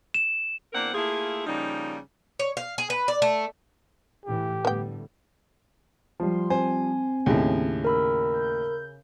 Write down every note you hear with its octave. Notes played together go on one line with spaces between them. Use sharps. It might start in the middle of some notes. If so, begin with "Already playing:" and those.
E7
E2 A#3 C4 D4 A#4 F#5
A3 A#3 E4 F4 G#4
C#3 F3 G3 A#3 D#4
C#5
F5
G#4
B4
D5
A3
A2 E3 G4
A2 D3 G3 B3 G5
F3 G3 C6
C4 C5 G#5
D#2 A2 C#3 G#4
A#4 B5 E6
G6